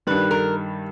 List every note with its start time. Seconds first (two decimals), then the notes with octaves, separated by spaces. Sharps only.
0.07 G2 D#3 G3 B4
0.31 A#4